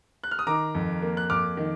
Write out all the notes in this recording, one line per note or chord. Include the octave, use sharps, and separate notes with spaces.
F#6
F6
D#6
D#3 A#5 D6
F2
A#3
F#6
F2 D6 F6
D#3